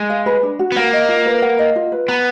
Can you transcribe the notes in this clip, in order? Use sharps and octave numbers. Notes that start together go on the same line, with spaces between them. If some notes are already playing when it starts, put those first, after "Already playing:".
Already playing: G#3
F5
B4
D4
F#4
B3
A#3 F#5
D#5
F4
B4
F#5
D#5
F4
B4
B3 A#5